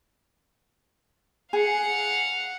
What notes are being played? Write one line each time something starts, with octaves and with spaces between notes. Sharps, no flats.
G#4 F5 F#5